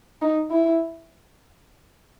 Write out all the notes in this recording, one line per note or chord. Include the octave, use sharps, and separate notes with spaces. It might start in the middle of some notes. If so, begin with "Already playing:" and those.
D#4
E4